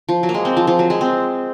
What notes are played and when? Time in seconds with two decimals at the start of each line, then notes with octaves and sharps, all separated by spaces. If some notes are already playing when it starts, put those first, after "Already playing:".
0.09 F3
0.23 F#3
0.29 A#3
0.34 G#3
0.45 C4
0.57 F3
0.67 F3
0.79 F#3
0.90 G#3
1.01 C4